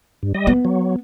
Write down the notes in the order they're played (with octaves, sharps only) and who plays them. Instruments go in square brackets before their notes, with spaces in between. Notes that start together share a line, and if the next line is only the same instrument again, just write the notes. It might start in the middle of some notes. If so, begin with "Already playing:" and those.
[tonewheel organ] G2
G3 D#5
[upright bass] B3
[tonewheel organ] F#3